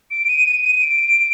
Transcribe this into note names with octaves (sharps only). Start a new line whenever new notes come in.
D7
D#7
D#7
D#7
D7